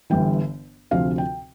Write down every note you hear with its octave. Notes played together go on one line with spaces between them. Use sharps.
G1 G2 E3 G5
D2 C3 F3 F5
G5